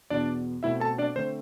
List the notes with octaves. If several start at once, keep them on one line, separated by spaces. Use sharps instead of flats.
E2 B2 B3 D4 D5
B2 A3 C4 E4 E5
A4 A5
D4 D5
D3 A3 C4 C5